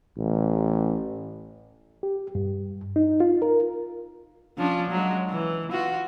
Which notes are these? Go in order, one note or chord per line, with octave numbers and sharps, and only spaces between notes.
A1
G4
G2
D#4
F4
A#4
F3 C#4 D4
F#3 G#3
E3
F4 F#4